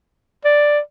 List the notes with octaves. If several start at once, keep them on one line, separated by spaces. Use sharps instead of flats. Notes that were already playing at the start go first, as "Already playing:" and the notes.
D5